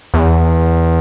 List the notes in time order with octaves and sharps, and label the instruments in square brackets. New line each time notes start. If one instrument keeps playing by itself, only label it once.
[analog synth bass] E2